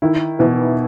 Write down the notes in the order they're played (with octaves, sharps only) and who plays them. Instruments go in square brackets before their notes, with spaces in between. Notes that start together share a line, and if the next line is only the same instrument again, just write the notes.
[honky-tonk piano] D#3 [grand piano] E4
[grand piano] B2 [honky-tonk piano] E3